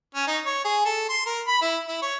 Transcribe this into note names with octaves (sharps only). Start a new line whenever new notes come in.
C#4
D#4
C#5
G#4
A4
C6
A#4
B5
E4
E4
C#5